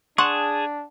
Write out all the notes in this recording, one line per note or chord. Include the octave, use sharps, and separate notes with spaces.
D4 G#4 F#5 A5 C6 C#6